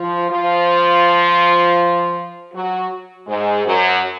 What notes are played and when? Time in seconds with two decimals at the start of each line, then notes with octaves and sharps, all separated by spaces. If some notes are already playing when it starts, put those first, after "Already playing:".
Already playing: F3 F4
0.30 F3 F4
2.54 F#3 F#4
3.28 G#2 G#3
3.65 F#2 F#3